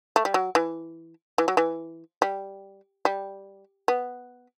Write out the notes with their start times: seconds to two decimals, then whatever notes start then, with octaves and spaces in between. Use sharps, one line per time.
0.16 A3
0.25 G3
0.34 F#3
0.55 E3
1.38 E3
1.48 F#3
1.57 E3
2.22 G3
3.05 G3
3.88 B3